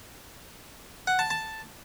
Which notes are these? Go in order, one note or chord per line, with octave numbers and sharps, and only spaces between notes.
F#5
A5
A5